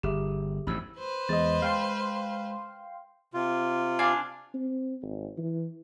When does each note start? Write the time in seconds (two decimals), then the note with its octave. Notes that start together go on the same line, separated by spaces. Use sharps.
0.03 G1 G4 G#4 E5
0.67 A1 F2 G#2 B5 E6
0.98 B4 C5
1.29 E2 G#3 D#5 A6
1.62 G#3 F5 G5 C6
3.34 C3 F4
3.99 D4 F5 G#5
4.54 C4
5.02 G#1
5.38 E3